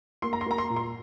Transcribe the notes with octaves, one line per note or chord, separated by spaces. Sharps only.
A#3 C6
A#5
C6
A#3 A#5
C6
A#2
C6